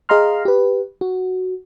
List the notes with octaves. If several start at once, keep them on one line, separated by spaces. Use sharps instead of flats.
G#4 D#5 F5 A#5 C6 F6
G4 B4
F#4